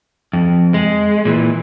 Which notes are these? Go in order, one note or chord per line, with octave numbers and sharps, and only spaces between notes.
F2
G#3
A#2 E3